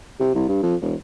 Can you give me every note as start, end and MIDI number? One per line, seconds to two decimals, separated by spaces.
0.20 0.32 48
0.35 0.44 36
0.48 0.58 43
0.63 0.75 41
0.81 0.94 28